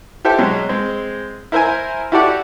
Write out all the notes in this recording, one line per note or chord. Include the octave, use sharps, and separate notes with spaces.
G4 A4 C5 E5 G5
B2 F#3 G#3
G#3 C4
E4 A#4 C5 E5 G#5
E4 F#4 G4 A4 D5 F#5